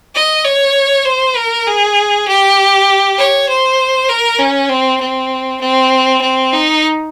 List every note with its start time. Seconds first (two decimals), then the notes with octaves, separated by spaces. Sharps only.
0.15 D#5
0.44 C#5
1.05 C5
1.35 A#4
1.67 G#4
2.28 G4
3.18 C#5
3.49 C5
4.09 A#4
4.39 C#4
4.69 C4
5.00 C4
5.61 C4
6.21 C4
6.53 D#4